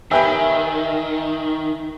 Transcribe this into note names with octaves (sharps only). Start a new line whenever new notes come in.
D#3 G4 B4 C#5 E5 G5 G#5